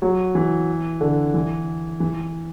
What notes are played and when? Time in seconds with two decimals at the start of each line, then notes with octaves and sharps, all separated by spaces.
0.02 F#3
0.35 E3
1.01 D3
1.34 E3
2.00 E3